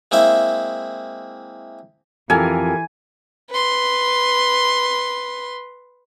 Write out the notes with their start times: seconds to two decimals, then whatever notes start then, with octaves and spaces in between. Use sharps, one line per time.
0.11 G#3 A#3 C4 E4 E5
2.30 F2 E3 G4 A4 A#4 G#5
3.50 B4 C6